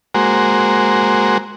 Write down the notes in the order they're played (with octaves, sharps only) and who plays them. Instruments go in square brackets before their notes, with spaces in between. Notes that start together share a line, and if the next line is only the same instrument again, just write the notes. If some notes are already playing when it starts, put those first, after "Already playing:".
[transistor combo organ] G#3 A#3 F#4 C5